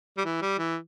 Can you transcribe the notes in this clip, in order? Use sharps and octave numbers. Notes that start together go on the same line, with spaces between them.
G3
E3
G3
E3